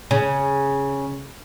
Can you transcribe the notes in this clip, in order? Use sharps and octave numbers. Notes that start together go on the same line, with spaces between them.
C#3